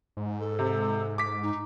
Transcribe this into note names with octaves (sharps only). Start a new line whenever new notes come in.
G#2
A4
C3
D6 B6
D#4